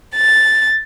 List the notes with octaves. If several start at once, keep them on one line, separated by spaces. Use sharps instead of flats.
A6